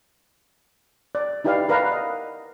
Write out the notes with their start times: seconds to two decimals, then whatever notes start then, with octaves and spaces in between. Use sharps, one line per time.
1.15 D5
1.45 D#4 E4 G4 B4 D5 F5
1.69 A#4 B4 D5 F5 F#5 A#5
1.92 D#5